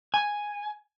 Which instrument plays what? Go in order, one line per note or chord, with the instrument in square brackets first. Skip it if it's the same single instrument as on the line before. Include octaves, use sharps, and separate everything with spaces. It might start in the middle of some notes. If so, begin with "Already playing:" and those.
[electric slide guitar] G#5